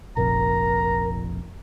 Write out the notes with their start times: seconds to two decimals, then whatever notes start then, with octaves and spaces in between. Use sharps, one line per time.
0.17 F1 A#1 F2 A#2 A#4 A#5